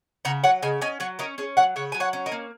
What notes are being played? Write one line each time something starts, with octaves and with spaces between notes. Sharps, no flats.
C#3 F#5 A#5
F#3 C#5 F#5
C#3 D#5 G#5
C#4 D#5 G#5
F#3 C#5 F#5
C#4 A#4 D#5
C#4 G#4 C#5
F#3 C#5 F#5
C#3 C#5 F#5
F#3 G#5
C#5 F#5
C#4
A#4 D#5
A#3